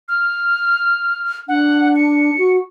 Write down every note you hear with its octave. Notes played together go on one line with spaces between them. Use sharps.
F6
D4 F#5
C#7
F#4